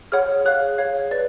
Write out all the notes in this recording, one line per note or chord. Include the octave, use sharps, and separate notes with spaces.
G#4 C#5 F#5 F6
G#4 C#5 F5 F#6
G#4 C#5 F5 G#6
B4 D5 F5 A6